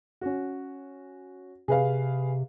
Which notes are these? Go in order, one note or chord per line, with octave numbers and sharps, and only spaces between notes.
C#4 F#4
C3 G#4 B4 F5